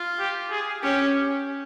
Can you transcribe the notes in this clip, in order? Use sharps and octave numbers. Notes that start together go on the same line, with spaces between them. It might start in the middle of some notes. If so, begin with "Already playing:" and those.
Already playing: F4
G4
G#4
C#4 G4